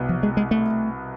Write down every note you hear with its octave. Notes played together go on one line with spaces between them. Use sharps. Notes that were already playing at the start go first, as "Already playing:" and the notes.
Already playing: C2 B2 B3
F3
G#3
G#3
A3